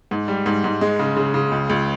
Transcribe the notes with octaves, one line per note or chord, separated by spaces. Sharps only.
G#2
G3
G#2
G#2
G#3
C#3
C#3
C#3
C#2
C#2